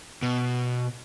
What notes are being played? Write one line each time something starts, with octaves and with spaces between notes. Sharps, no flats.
B2